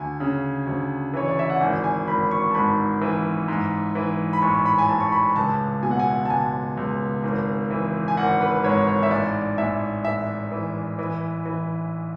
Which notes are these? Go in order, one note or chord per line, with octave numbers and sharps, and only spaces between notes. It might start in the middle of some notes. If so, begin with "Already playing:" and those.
Already playing: D2 G#5
C#3
D2
E3 C#5
D5
E5
F#5
G#1 G#5
G#5
G#1 B5
C#6
A5
G#2 B5
E3
G#2
E3
B5
A1 C#6
B5
G#5
A1 A5
C#6
B5
C#2 A5
B2 G#5
F#5
G#5
A5
C#2 G#5
C#2
G#1
E3
G#5
G#1 F#5
B4
G#2 C#5
C#5
E5
A1 D5
A1 E5
A1 E5
E3
E3
E3